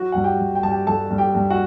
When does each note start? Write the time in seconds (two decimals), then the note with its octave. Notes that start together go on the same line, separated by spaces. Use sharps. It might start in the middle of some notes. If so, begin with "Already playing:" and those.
Already playing: F#3 F#4
0.12 G2 F#5
0.24 G4 G5
0.39 G2
0.55 G5
0.63 G2 A5
0.70 G4 G5
0.87 G2 A4 A5
1.11 G2
1.18 G4 G5
1.35 G2
1.50 F#4 F#5